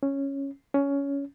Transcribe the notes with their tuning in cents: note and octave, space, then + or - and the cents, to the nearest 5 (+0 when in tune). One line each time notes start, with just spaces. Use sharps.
C#4 -5
C#4 +15